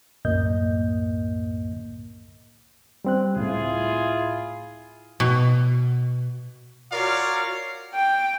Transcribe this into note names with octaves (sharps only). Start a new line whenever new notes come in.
C2 F#2 A2 A#3 D#5 G6
G3 C4 F#6
C#2 A2 E4 F4 G#4
B2
F4 F#4 A#4 C#5 D5 F5
G5